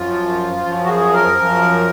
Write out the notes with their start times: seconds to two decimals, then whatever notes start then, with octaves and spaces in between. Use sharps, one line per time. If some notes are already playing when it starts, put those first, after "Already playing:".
Already playing: F#2 F3 F4
0.64 F#2 F3
0.85 F#4
0.89 G#4
1.13 A#4
1.39 F#2 F3